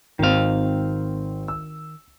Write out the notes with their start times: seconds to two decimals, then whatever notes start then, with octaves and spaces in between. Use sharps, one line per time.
0.19 G#1 D#3 C4 F5
1.48 E6